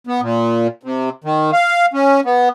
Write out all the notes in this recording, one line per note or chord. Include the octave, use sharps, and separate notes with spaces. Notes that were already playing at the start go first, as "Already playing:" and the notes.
B3
A#2
C3
D#3
F5
C#4
B3